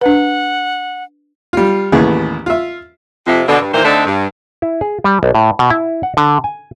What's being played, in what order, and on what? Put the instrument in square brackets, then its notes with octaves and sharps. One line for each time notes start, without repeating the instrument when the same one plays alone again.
[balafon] D4 B4 [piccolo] F#5
[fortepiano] G3 F4
A1 D#2 E3 B3 G#4
F4 E5
[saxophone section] F2 C3
B2 D3
G2
A#2 D#3 E3 C5
D3 A3 C4 D4 D#4
G2
[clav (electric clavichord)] E4
G#4
G3
B1
A2
B2
E4
F#5
D3
G#5